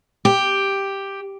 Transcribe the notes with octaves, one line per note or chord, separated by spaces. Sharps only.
G4